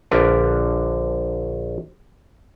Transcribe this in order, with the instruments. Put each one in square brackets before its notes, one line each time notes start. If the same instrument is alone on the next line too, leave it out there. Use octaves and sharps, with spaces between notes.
[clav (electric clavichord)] A#1 D3 A#4 B4 D5